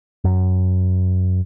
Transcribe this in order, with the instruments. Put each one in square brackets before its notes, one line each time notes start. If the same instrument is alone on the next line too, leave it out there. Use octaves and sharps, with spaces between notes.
[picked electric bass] F#2